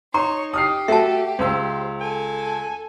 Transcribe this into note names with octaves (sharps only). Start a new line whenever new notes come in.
D#4 C#5 A#5 C6
G4 D#6 F6 C7
A3 F#4 A4 E5 A5
C#2 C5 E6
A4 G#5